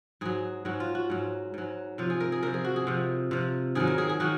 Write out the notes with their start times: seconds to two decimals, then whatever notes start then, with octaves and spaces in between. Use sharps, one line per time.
0.21 G#2 F#3 G#4
0.65 G#2 F#3 F#4
0.80 F4
0.95 F#4
1.10 G#2 F#3
1.54 G#2 F#3
1.98 C3 F3 F4
2.10 G#4
2.20 A#4
2.32 G#4
2.43 C3 F3 A#4
2.54 G#4
2.65 F#4
2.76 G#4
2.87 C3 F3
3.31 C3 F3
3.75 G#2 D#3 F#3 G#4
3.87 A#4
3.98 G#4
4.09 G#4
4.20 D#3 F#3 F#4